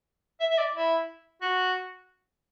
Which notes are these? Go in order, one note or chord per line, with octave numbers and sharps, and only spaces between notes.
E5
E5
D5
E4
F#4